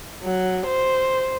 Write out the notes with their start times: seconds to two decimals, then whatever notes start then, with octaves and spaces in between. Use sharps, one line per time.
0.23 F#3
0.67 C5